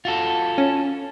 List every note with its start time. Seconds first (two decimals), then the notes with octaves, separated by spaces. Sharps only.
0.05 F4 F#4 A4
0.58 C#4